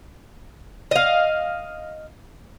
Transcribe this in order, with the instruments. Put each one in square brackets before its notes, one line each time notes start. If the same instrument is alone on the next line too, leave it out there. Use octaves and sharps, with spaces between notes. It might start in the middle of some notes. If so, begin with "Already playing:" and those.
[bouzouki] D#5 F5